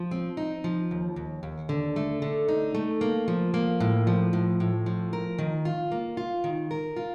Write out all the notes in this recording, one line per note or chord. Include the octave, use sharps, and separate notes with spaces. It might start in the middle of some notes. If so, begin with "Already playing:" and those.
Already playing: F3
C4
D#4
F3
D#2
D#2
D#2
D3
A3
D3
D#4
A3
A#3
F3
A#3
A2
F3
A2
A2
F3
A#4
D#3
F4
A#3
F4
D#3
A#4
F4